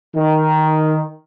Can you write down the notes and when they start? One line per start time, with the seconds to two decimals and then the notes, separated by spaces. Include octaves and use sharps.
0.15 D#3